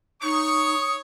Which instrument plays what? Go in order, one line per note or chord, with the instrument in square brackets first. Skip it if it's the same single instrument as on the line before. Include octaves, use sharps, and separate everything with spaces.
[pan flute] D#4 [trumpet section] C#5 C#6 [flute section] D#6